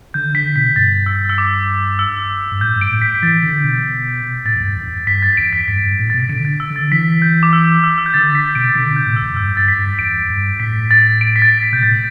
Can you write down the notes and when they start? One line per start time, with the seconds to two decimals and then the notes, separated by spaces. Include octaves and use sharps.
0.14 D3 G6
0.35 D3 B6
0.56 B2 B6
0.76 G2 A6
1.06 E6
1.29 E6
1.38 D6
1.99 E6
2.51 G2
2.61 A2 G6
2.76 G2
2.81 D7
2.91 A2
3.02 B6
3.15 B6
3.22 E3 A6
3.42 D3
3.64 B2
4.45 A2 A6
4.55 E2
4.60 G2
4.76 E2
5.07 G2 B6
5.22 A6
5.37 E2 D7
5.53 B6
5.68 G2 B6
5.83 G2
5.99 A2
6.10 B2 A6
6.20 B6
6.29 D3 D7
6.45 A6
6.60 E6
6.70 D3
6.76 A6
6.91 E3 B6
7.22 G6
7.43 D6
7.53 E6
7.84 E6
7.98 E6
8.06 G6
8.14 D3 A6
8.35 B6
8.55 B2 D7
8.69 A6
8.75 D3 B6
8.91 B2
8.96 G6
9.06 A2
9.16 E6
9.22 E2
9.37 G2 E6
9.57 G2 A6
9.68 B6
9.78 G2
9.98 E2 D7
10.29 G2
10.60 A2 B6
10.91 A6
11.21 D7
11.36 B6
11.42 A6
11.63 B6
11.72 B2 G6
11.83 A2 A6